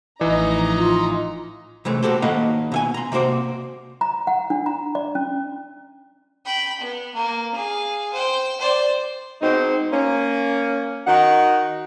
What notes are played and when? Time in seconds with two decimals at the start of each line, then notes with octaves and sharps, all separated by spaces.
0.21 A1 E3 F3 D#4 A#5
0.77 F4
1.85 C3 E3 G#3 A3
2.03 A#3 F#4 G4 A4 C5
2.22 D#3 A#3 B4 F5 F#5
2.72 B2 E5 G#5
2.94 A#5 C6
3.12 C3 A#3 F#4 C5 D5
4.01 A#5
4.27 F#5
4.50 D4
4.66 A#5
4.95 D5
5.15 C#4
6.46 G5 B5
6.80 B3
7.14 A#3
7.54 G#4 F5
8.13 C5 G5
8.60 C5 D5
9.41 B2 G#3 C4 D#4
9.91 A#3 C#4
11.06 D#3 F#4 D#5 F#5